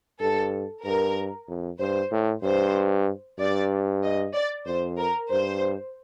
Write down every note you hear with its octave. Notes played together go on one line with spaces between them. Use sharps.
G2 A4
G2 A#4
F2
G2 C5
A2
G2 C5
G2 D5
D#5
D5
F2 C5
A#4
G2 C5